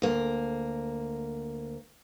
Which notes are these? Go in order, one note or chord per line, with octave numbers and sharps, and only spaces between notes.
D2 A#3